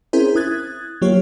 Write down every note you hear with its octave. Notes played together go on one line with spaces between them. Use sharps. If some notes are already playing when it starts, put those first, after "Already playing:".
C4 C#4 E4 G#4 A#4 C5
E4 D#6 F#6 G#6 A6
F#3 A#3 F4 G4 C#5